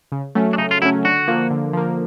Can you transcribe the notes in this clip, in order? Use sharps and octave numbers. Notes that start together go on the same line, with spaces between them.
C#3
F#3 A3 C#4
D4
C#3 D#4
F4
F#3 A3 C#4 E4
D3 F#4
F3 A#3
D3
F3 A#3